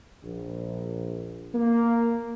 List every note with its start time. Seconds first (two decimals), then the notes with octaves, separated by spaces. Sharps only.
0.23 A#1
1.55 A#3